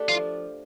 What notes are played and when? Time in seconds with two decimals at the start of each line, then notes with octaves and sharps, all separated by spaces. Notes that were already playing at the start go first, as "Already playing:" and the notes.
Already playing: A3 D4 G4
0.09 F3 F4